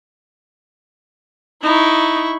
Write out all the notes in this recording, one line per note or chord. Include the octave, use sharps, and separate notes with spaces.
D#4 E4 C#6